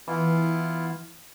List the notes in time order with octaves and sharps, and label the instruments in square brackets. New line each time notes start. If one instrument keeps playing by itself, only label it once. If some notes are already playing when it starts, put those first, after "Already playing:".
[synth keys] E3 [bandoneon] B3 E4 F4